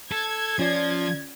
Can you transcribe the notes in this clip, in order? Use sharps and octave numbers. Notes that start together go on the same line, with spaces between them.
A4 G#6
F3 C#4 F4 D5